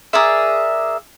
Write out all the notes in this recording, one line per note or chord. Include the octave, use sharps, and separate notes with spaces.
G#4 A#4 D5 E5